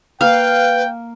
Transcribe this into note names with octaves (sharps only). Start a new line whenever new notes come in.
A#3 B4 F5 G5